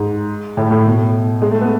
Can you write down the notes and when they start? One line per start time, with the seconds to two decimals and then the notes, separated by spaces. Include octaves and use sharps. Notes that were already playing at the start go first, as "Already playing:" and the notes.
Already playing: G#2
0.57 A2
0.71 A2
0.86 B2
1.42 G#3
1.51 A3
1.61 B3